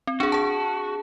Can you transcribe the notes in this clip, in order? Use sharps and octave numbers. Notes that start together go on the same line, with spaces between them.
C4
D4 F#4 G#4
G#4 A5